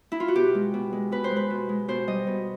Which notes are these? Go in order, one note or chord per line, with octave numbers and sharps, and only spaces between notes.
E4
F4
F#4
B2 G4
G#3
B2
G#3
B2 B4
C5
G#3
B4
B2
G#3
B2 C5
G3 D#5
B2